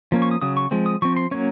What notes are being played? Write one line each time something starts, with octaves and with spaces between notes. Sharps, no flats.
F3 A#3 C#4
C#6
D#6
C#3 F#3 D#6
C#6
F3 G#3 C4
D#6
F3 C4 C#6
C6
F#3 A#3 C#4 C#5